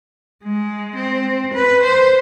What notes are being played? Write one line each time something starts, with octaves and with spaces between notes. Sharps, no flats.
G#3
C4
B4
C5